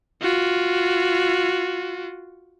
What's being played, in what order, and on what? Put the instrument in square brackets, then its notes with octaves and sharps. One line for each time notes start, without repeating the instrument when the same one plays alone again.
[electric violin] F4 F#4